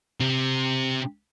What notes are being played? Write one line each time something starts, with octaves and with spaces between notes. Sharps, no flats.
C3